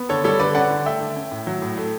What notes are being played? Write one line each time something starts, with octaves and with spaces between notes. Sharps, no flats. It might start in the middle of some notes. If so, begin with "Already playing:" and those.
Already playing: B3
D3 A4 C#5
G3 A4 C#5
D3 B4 D5
C#4 D5 F#5
D3
A3 E5 G5
D3
C#4
A2
F#3
A2
A3